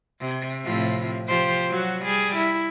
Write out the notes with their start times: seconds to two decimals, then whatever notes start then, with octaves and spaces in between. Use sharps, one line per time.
0.20 C3
0.65 A2 C3 F3
1.28 F3 G4 C5
1.69 F#3 F#4
2.05 G3 G#4
2.36 E4